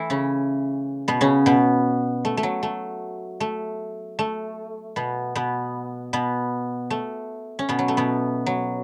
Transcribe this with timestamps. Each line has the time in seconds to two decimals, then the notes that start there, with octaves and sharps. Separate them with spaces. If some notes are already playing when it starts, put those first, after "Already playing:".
Already playing: E3 A3 E4
0.10 C#3 C#4
1.08 B2 B3
1.21 C#3 C#4
1.46 B2 B3
2.25 A3
2.37 A3
2.43 F#3
2.63 A3
3.40 A3
4.19 A3
4.96 B2 B3
5.35 B2 B3
6.13 B2 B3
6.90 A3
7.59 C#4
7.69 B2 B3
7.79 F#3
7.88 A3
7.97 B2 B3
8.46 F#3